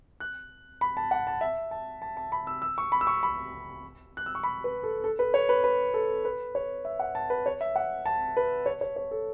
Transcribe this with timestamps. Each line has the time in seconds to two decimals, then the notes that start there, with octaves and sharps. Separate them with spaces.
0.20 F#6
0.81 B5
0.97 A5
1.11 F#5
1.27 A5
1.41 E5
1.71 A5
2.02 A5
2.17 A5
2.32 B5
2.47 E6
2.62 E6
2.78 C#6
2.92 B5
3.01 E6
3.07 C#6
3.23 B5
4.17 F#6
4.26 E6
4.35 C#6
4.43 B5
4.64 B4
4.83 A4
5.04 A4
5.19 B4
5.34 C#5
5.49 B4
5.64 B4
5.94 A4
6.25 B4
6.55 C#5
6.85 E5
7.00 F#5
7.15 A5
7.30 B4
7.46 C#5
7.61 E5
7.76 F#5
8.06 A5
8.37 B4
8.66 C#5
8.81 C#5
8.96 C#5
9.11 A4